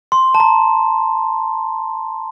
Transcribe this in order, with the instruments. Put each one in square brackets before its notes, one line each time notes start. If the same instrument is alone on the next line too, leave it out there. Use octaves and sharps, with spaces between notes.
[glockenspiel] C6
A5
A#5